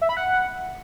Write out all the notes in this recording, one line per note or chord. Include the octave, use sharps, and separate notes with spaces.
E5
B5
F#5